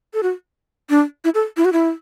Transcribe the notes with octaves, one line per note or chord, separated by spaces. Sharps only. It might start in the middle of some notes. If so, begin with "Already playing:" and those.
A4
F#4
D4
E4
A4
E4
F#4
E4